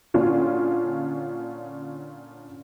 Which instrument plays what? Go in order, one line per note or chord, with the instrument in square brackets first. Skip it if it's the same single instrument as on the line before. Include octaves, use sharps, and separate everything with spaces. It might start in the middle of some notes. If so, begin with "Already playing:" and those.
[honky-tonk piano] A#2 D3 C#4 D4 F4